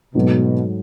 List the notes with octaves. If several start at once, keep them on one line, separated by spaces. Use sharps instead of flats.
G#2 B2 F#3 A3